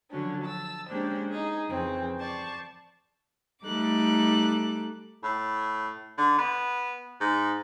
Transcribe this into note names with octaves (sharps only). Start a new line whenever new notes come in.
D3 F3 F#3 C#4 D4
A5 E6
G#3 A#3 C#4 D4 G4 C5
D#4 G#4
F2 C#3 E3 C4
C5 D5 A5 C#6
G3 A3 D#4 A4 D6 F#6
A2
D3
B3
G#2